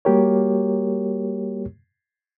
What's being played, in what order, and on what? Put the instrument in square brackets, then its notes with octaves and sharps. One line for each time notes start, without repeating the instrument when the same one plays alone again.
[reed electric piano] G3 A#3 F#4 G4 A#4 C#5